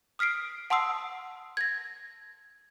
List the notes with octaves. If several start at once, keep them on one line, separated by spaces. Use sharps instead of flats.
D#6 F6 B6 C7 D7
F#5 A5 C6 D#6 E6 C7
G#6 A#6